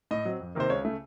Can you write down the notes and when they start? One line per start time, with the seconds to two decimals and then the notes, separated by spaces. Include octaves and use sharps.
0.11 A2 D#5
0.25 F#3 C4
0.40 F2
0.55 C3 D#3 A#3 C5
0.70 C#2 C#5
0.85 C#3 A3